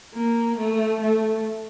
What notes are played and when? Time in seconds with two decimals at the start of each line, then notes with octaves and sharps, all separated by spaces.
0.15 A#3
0.58 A3
1.01 A3